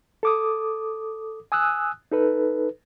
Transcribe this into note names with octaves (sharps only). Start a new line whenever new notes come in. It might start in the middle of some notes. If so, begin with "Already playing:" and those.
A4 D6 D#6
G#5 D#6 E6 F#6
D#4 A4 B4